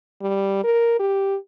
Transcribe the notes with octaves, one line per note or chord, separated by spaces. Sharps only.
G3
A#4
G4